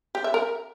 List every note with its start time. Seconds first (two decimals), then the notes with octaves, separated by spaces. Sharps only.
0.15 G4
0.24 E5
0.34 A#4